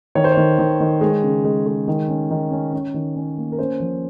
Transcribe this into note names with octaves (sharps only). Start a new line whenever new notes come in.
D#3 C#5
C5
C#5
D#3
D#3
D#3
G#3
C#3
G#3
G#3
D#3
C#4
D#3
C#4
C#4
D#3
C#4
A#3
A#4
C#4 C5
F3